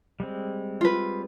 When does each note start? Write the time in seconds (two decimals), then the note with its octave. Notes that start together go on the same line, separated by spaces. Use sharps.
0.20 G3 G#3 C4
0.81 F4 B4